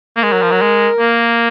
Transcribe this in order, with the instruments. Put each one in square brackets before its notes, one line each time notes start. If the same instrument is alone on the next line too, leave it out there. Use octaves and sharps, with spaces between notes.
[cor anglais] A#3
[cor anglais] G#3 [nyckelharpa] A#4
[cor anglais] F#3
F3
F#3
G#3
A#3